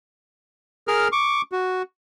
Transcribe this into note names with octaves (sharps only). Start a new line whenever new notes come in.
G#4 A#4 F6
C#6 D6
F#4